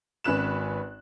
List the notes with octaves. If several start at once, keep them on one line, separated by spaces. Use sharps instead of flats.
G#1 C#4 B4 F#6 E7